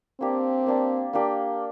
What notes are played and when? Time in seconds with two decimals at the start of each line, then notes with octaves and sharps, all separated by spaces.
0.20 A#3 C4 D4 G4
0.67 A#3 D4 G4
1.13 A#3 D4 G4